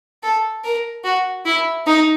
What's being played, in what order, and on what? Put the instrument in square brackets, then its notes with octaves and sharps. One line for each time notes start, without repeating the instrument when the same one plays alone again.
[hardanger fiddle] A4
A#4
F#4
E4
D#4